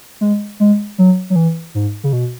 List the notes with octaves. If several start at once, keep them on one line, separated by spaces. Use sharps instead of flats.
G#3
G#3
F#3
F#3
E3
G#2
C#3
B2